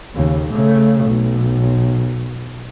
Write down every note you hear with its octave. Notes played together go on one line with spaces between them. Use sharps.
D#2 C#3
C#3 A3
B1